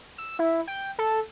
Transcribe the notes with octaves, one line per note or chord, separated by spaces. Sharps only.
E6
E4
G5
A4